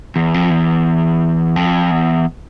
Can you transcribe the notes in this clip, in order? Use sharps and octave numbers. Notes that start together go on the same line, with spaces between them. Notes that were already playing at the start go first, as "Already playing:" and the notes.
E2
F2
E2
F2
E2